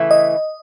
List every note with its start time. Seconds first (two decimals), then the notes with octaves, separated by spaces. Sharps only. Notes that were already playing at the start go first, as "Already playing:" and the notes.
Already playing: C#3 E3 A3 E4
0.11 D#5